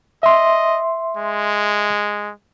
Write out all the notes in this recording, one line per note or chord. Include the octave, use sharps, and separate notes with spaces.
D#5 E5 C6
G#3